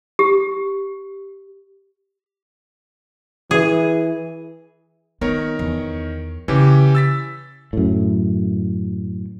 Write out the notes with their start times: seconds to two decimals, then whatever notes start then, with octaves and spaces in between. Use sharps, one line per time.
0.19 G4
3.51 E3 G#4
5.21 D#3 B3 A#4 C#5
5.59 E2
6.48 C#3 E3 C#4 G4
6.95 E6 A6 B6
7.73 F#2 A2